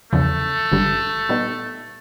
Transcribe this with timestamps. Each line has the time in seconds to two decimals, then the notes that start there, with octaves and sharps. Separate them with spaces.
0.12 E2 C#3 F3 A3
0.71 G#1 G2 D3 G3
1.29 A#2 G3 B3 D#4